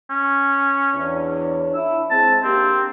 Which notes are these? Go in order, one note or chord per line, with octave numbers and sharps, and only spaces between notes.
C#4
E2 D4 C#5
D4 E4 E6
G#3 C4 A5
A#3 C4 D4 G4